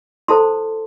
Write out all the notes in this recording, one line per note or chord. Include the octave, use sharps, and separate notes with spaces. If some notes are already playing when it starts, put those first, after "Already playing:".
E4 A4 C5 A5 C6